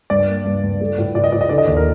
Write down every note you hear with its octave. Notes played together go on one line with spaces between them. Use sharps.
G2 D5
A#3
G2
G2
A3
A2
A2 D5
D#5
A2 D5
D#5
D3 D5
D#5
D#2 D5
A#4